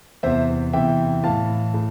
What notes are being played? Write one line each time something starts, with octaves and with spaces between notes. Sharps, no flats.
E2 C3 E3 C5 E5
E2 C3 E3 E5 G5
A2 E3 F5 A5
A2